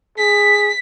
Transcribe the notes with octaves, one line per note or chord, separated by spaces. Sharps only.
G#4 B6